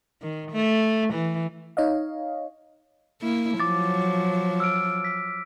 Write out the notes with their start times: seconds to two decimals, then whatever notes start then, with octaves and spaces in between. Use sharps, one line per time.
0.22 D#3
0.52 A3
1.14 E3
1.77 D#4 C#5 D#5 F5
3.22 A#3 E4
3.60 F3 F#3 D6 A6
4.60 E6 F6 D7
5.04 B6